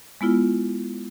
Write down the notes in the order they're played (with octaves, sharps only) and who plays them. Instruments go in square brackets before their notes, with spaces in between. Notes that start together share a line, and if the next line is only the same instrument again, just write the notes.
[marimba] G#3 B3 E4 F4